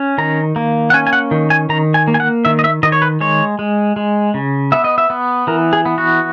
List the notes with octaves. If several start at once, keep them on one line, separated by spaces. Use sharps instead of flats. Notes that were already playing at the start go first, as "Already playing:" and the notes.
Already playing: C#4
D#3 A#5
A#3
F#5
C#4 G#5
G#5
F#5
D#3
G#5
D#3 A#5
G#5
A#3
G#5
F#5
D#3 E5
D#5
E5
D#3 D#5
C#5
B4
G#3 C#5
G#3
G#3
C#3
B3 E5
D#5
E5
B3
E3 A#4
G#4
B3
F#4